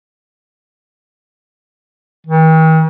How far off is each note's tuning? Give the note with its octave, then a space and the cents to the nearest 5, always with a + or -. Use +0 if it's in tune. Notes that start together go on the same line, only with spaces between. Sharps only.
D#3 +45